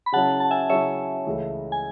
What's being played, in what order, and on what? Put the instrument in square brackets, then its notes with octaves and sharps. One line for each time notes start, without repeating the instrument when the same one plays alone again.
[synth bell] B5
[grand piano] C#3 F#3 C#4 E4 [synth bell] F#5 A5
[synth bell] A5
E5 G#5
[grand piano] C#3 F#3 C#4 E4 [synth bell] C#5 E5
[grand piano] C#2 C#3 E3 A3
[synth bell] G#5